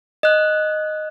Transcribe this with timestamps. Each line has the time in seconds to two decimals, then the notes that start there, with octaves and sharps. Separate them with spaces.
0.23 D#5 F#6